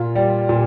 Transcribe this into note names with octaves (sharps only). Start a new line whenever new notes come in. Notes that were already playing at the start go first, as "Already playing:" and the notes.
Already playing: A#2 F4
G3
A#2